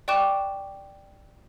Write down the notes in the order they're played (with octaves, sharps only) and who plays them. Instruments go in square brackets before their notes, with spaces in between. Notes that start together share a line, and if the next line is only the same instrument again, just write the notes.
[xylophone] D5 G5 C#6 D6 F#6 E7